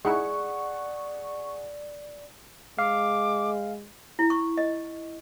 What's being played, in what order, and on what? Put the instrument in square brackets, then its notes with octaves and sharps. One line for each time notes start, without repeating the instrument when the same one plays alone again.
[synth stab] G#3 D#4 E4 [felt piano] G#4 F#5 [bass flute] D5 [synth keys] C#6
[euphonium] G#3 [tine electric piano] F5 [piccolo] D6
[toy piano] E4
C#6
D#5